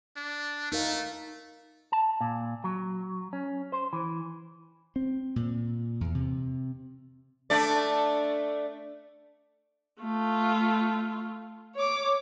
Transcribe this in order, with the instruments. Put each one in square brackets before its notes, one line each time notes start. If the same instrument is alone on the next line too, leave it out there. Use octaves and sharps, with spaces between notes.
[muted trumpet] D4
[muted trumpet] A3 [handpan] D#4 A#4 F5
[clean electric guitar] A5
A#2
F#3
C#4
C5
E3
[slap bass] C4
A#2
E2
C3
[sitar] A3 D4 D5
[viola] A3 F4
C#5 D6